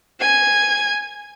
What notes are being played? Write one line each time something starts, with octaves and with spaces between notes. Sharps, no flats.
G#5 G#6